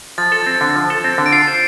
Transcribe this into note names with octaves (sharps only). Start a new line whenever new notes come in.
F3 A6
A4
C4
D3
F3
A4
C4
D3
D7
F4 C7
C5